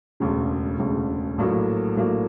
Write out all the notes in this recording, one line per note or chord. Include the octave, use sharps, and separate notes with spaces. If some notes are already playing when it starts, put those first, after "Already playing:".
E1 D2 C#3
E1 D2 C#3
A#1 A2 F#3 A#3
A#1 A2 F#3 A#3